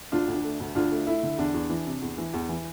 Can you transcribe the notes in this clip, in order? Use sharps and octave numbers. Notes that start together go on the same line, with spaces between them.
D2 D4 F4
D2
D4
A3
D2
D2 D4 F4
A3
A3 E4
D3
E2 D4
E2
E3
C3
E2
E3
E2
E3